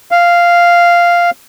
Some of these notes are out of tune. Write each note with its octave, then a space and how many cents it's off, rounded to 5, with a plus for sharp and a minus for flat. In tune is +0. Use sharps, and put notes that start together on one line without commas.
F5 -5